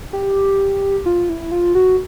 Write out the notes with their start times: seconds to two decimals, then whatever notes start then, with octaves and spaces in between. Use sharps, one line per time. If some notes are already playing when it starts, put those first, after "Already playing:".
0.13 G4
1.06 F4
1.29 E4
1.51 F4
1.75 F#4